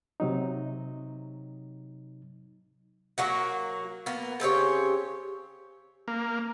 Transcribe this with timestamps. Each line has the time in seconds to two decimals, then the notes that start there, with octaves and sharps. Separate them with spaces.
0.20 C3 F#3 D#4
3.18 F#3 A#3 F#4
4.06 A#3 B3
4.40 C#3 C4 G4 C#5
6.08 A#3